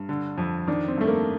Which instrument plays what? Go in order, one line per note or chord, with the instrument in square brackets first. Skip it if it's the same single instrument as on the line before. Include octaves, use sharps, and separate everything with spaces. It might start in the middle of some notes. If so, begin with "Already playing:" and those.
Already playing: [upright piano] G2
D3
F2
[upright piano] D#3 [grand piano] D4
[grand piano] C4
[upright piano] G2 [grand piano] A3
[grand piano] A#3